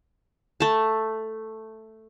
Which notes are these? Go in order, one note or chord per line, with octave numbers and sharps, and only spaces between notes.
A3 A5